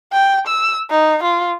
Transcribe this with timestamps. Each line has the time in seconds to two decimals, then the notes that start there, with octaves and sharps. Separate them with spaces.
0.12 G5
0.47 E6
0.90 D#4
1.23 F4